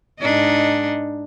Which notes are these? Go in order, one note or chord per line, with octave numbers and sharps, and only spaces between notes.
G#2 D4 D#4